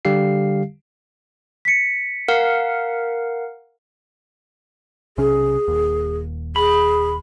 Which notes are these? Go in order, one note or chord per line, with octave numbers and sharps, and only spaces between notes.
D3 G3 G4 F5 C7
B6 C#7
A#4 F5 F#5
B1 C3 C#4 G#4
D#1 D#2
G#4 B5